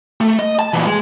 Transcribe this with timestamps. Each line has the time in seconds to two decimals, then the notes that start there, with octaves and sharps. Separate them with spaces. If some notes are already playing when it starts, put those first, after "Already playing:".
0.21 A3
0.39 D#5
0.59 A5
0.73 A#2 E3
0.87 G#3